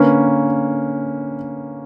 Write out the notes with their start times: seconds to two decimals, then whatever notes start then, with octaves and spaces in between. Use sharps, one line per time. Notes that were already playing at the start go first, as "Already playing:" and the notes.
Already playing: D3 A#3 C#4 B4